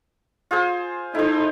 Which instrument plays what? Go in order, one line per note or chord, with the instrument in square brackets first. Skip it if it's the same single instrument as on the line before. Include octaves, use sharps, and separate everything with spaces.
[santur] F4 G#4 C5
[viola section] D#4 A4 [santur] E4 C5